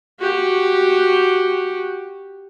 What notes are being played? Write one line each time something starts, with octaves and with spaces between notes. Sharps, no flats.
F#4 G4